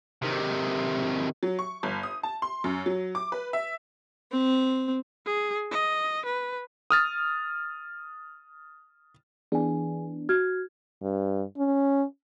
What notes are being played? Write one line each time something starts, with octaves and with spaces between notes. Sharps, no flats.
C3 D#3
F#3
C#6
G1
D#6
A5
C6
F#2
F#3
D6
B4
E5
C4
G#4
D#5
B4
D#6 F6 A6
E3 B3 D4 G#4 G#5
F#4 F6 G#6
G2
C#4